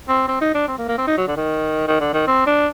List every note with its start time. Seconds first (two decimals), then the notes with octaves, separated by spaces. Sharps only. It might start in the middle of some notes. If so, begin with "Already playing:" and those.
0.08 C4
0.28 C4
0.41 D#4
0.54 D4
0.68 C4
0.78 A#3
0.88 A#3
0.98 C4
1.07 D#4
1.17 F#3
1.27 D3
1.37 D#3
1.88 D#3
2.00 D3
2.13 D#3
2.27 C4
2.46 D4